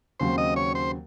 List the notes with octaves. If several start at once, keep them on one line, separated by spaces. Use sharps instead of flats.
D#2 C#3 F#3 C4 C5
D#5
C#5
C5